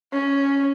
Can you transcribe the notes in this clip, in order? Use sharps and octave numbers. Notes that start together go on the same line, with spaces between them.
C#4